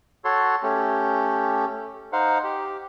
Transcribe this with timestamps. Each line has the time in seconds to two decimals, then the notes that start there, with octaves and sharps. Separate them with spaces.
0.25 F#4 A4 C#5 C6
0.63 A3 C#4 G4
2.13 D#4 C5 F5 F#5
2.44 G4